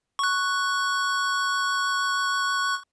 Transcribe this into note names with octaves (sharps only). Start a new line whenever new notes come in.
C#6 F#6